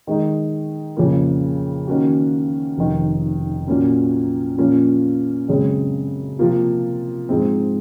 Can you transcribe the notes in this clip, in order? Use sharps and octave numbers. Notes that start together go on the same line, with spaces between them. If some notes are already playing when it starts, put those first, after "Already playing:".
D#3 G#3 D#4
F2 C#3 F3 A#3
D#3 A#3 C#4 F#4
F1 F2 D#3
A#2 F#3 A#3 C#4
A#2 F3 A#3 C#4
F#2 C#3 G#3 C4
C3 F3 A#3 F4
G#2 F3 G#3 C4